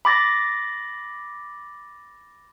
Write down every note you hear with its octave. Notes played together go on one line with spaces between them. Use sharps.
B5 D6 A6 A#6